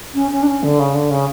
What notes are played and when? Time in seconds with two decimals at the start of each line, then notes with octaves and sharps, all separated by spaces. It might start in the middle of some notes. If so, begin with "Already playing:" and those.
0.14 C#4
0.31 C#4
0.43 D4
0.47 C#4
0.63 D3
0.80 C#3
0.94 D3
1.11 C#3